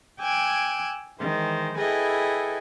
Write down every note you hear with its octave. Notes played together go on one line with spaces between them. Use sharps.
G5 G#5 D6 E6 F#6 G#6
D#3 E3 G#3 C5
E4 G#4 A4 B4 D#5 G5